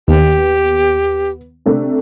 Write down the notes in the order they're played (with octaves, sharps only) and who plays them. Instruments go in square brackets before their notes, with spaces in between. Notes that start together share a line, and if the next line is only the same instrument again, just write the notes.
[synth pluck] D#2 [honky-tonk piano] B3 [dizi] G4
[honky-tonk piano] C3 A3 D4